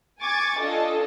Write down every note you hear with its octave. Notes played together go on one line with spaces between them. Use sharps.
G#5 C#6 D6 G#6 A6
D4 F4 A4 D#5